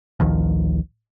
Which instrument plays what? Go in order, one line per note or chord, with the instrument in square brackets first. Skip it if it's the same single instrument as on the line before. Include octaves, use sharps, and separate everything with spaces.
[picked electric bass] A1 D2 D#3 F3